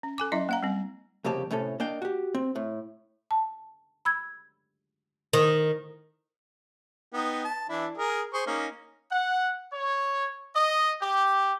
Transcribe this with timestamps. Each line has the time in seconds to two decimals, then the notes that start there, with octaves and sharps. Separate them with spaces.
0.03 C#4
0.18 A4 G#5 D6
0.32 F#3 C#4 E4 D#5 E5
0.49 A#3 F5 A#5
0.63 G3 C4
1.24 C2 F2 C#3 A#3 G4 A5
1.51 A2 C3 C#4 A4
1.80 A#3 D4 D#5 F5 G5
2.02 F#4 G4
2.34 C4
2.56 A2
3.31 A5
4.05 B5 E6 G#6
5.33 D#3
7.13 B3 D#4 G5
7.44 A5
7.69 E3 D4 E4
7.97 G#4 A#4
8.33 G#4 C5 C#6
8.46 A#3 C#4 D#4
9.11 F#5
9.73 C#5
10.53 D#5
11.01 G4